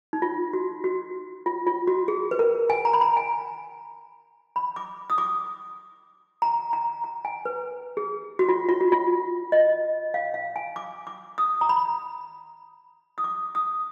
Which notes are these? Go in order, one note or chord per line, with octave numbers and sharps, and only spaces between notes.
D#4
F4
F#4
F#4
F4
F4
F#4
G#4
B4
A#4
G#5
A#5
B5
A#5
G#5
B5
D6
D#6
D6
A#5
A#5
A#5
G#5
B4
G#4
F#4
F4
F4
F#4
F4
D#5
F5
F5
G#5
D6
D6
D#6
A#5
B5
D#6
D6
D#6